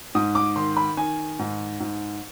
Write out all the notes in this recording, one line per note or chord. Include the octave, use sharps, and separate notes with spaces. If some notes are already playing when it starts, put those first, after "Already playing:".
G#2 D#6
D6
D#3 C6
B5
D#3 G#5
G#2
G#2